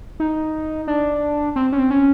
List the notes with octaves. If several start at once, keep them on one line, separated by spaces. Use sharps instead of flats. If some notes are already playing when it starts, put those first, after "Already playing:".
D#4
D4
C4
C#4
C4
C#4